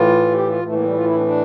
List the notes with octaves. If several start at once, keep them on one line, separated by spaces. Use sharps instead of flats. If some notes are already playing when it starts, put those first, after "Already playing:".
Already playing: A2 E3 F4
G4
F4
A2 E3 A3
A#3
G3 E4
F4
E4
D4
C4
D4